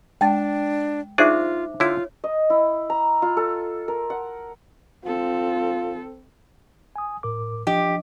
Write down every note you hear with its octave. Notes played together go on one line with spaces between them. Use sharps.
G#3 D4 G5 A5 A6
D4 D#4 F4 G#4 C5 E5 D6
D3 E4 F4 C#5
D#5
E4
A#5
F4
A4
A#4
F#5
C4 F4 A4
G#5 D#6
A2 A#4 D6
F3 D4 G4 D#5